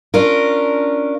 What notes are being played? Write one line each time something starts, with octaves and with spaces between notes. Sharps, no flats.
C#4 D4 F4 A#4